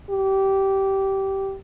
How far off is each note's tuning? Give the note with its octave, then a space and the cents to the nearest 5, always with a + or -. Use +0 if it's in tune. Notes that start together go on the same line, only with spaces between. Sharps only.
G4 -15